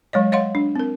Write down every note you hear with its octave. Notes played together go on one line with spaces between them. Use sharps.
F#3 G#3 C#5 D#5
C#5 D#5 F5 F#5 C6
D4
C4 A#4